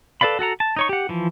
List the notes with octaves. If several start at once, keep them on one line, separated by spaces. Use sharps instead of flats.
A4 B4 D5 F5 B5
F#4 A4 F#5 A#5
A5
D#4 C#5 C#6
G4 F#5
E3 F3